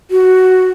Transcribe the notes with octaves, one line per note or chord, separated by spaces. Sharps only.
F#4